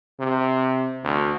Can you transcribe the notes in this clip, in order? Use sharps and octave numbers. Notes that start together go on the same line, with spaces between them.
C3
D2